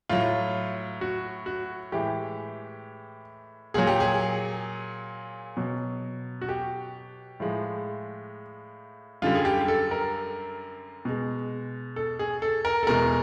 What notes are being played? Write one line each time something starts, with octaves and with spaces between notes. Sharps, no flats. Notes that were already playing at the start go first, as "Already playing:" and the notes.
A2 F#3 F4
F#4
F#4
A2 E3 G#3 G4
A#2 F#3 G#4
G4
G#4
B2 F#3
F#4
G4
A2 F3 G#3
F#2 D3 G3 F4
G#4
G4
A4
A#4
B2 G#3
A4
G#4
A4
A#4
A4
E2 B2 G#3 A#4